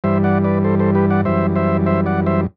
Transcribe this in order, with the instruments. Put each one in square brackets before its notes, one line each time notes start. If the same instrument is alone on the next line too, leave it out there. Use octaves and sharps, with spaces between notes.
[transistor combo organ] G2 E3 G3 C5 E5
D5 F#5
B4 D5
A4 C5
A4 C5
G4 B4
D5 F#5
F#2 E3 G3 C5 E5
C5 E5
C5 E5
D5 F#5
C5 E5